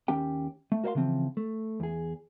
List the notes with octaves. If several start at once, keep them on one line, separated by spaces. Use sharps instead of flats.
D#2 C#4 G4 G5
A3
F#4 A#4 C5 D#5 F5 C6
C#3 E3 F3 C4
A3
E2 G#4